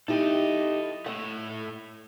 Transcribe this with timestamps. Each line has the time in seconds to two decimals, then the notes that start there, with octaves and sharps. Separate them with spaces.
0.08 D#4 E4 G4 A4 D#5
1.06 A2 A3 F#5